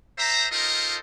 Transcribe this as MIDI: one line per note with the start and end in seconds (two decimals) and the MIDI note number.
0.18 0.46 67
0.18 0.46 72
0.18 0.46 76
0.18 0.46 82
0.52 0.96 63
0.52 0.96 65
0.52 0.96 69
0.52 0.96 70
0.52 0.96 72
0.52 0.96 75